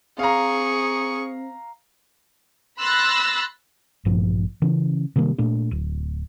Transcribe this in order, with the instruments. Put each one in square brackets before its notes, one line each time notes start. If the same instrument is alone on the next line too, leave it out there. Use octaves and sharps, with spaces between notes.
[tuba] C4 [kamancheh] G#4 C#6 [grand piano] F5 A#5
[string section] B5 C6 E6 F#6 A6 A#6
[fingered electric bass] A1 G2 A#2 F3
C#3 E3 C#4
C3 D#3 G3 A#3
A#2 A3 D4
D1